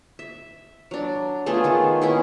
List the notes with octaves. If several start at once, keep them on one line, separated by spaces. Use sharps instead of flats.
E5
F#3 D4
A3 B3 F4 G#4
D#3 A3
B3 C#4 E4 G#4